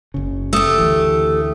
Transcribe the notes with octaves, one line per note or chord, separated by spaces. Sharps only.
F#1 C#3
A3 G4 D#6 E6
D2 E3